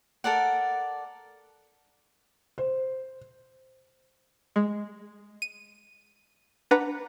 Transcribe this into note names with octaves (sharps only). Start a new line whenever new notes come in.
A4 A#4 D5 F#5
C5
G#3
D#7
D4 B4 F#5 A#5